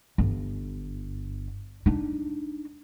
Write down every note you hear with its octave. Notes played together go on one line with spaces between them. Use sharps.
G1
D4 D#4